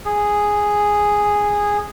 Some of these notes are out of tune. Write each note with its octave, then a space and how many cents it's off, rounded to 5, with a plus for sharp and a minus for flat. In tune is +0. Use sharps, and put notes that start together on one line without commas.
G#4 -5